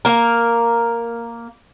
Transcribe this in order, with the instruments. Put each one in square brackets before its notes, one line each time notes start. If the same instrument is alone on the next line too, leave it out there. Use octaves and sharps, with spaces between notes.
[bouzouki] A#3 A#4